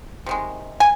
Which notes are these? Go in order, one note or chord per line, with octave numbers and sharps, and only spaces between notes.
C3 D#3 G#3
G#5